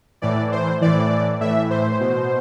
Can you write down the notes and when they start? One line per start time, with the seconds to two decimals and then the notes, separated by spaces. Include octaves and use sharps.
0.22 A2 E3 D5
0.52 C5
0.81 A2 E3 D5
1.41 A2 E3 E5
1.70 C5
2.00 B2